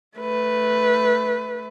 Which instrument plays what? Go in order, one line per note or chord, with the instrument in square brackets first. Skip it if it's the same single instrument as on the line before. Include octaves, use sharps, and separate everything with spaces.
[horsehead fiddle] A3 B4